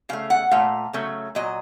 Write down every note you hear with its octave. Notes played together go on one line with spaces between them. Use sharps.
C#3 A3 F5
F#5
A#2 A3 F5
C#3 F#3 A3
A#2 F#3 D#5